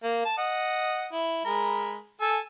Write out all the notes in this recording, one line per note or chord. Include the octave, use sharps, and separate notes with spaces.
A#3
A5
D#5 F#5
E4
G#3 A#4 B5
A4 G#5 E6